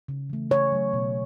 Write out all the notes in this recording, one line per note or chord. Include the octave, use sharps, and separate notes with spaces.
C#3
E3 A3
C#3 C#5
F#3 A3
B2